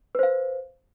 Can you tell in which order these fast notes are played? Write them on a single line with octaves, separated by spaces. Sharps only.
B4 C5 F5